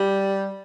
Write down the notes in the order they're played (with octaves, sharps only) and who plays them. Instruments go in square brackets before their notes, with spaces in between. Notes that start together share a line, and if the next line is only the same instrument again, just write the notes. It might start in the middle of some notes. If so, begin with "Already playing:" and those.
Already playing: [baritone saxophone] G3